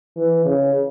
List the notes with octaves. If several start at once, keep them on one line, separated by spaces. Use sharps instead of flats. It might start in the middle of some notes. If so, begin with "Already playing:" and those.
E3
C#3